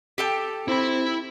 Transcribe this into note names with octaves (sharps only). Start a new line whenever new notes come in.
G4 A4 G5
C4 E4 B5